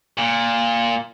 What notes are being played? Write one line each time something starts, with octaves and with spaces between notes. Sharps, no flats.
A#2